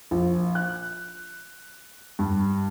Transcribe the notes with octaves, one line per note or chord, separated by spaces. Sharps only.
A#1
F#6
G2